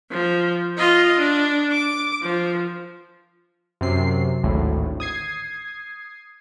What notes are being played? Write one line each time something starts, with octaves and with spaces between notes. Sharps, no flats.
F3
F4 D#5
D4
D6
F3
F#2 C3 C7
G#1 D2 A2
D#6 G#6 C7